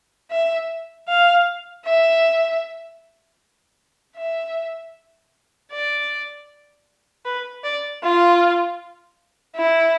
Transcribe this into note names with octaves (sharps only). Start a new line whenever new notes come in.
E5
F5
E5
E5
D5
B4
D5
F4
E4